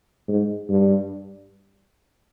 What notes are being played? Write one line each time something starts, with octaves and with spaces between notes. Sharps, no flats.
G#2
G2